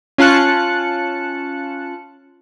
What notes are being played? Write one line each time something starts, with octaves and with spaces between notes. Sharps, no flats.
C#4 F4 A5 F#6 C#7